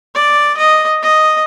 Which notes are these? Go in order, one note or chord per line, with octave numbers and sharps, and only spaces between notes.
D5
D#5
D#5